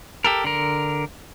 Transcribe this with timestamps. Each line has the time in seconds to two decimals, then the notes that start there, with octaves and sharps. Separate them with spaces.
0.24 G4 A4 A#4
0.44 D3 A#4